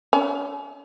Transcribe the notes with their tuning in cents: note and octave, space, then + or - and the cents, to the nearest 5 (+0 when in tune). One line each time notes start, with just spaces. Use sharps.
C#4 +40